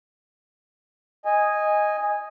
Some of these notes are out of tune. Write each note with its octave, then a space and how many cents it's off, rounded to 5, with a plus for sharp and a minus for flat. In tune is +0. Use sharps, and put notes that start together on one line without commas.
D#5 +0 G#5 -10